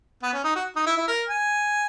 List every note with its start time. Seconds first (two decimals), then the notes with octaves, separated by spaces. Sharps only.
0.23 B3
0.34 C#4
0.44 D#4
0.56 F#4
0.76 D#4
0.87 E4
0.98 E4
1.08 A#4
1.29 G#5